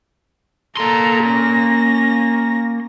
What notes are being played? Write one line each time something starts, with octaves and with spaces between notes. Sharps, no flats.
A#3 A4 A#5 C6
C#4 A#6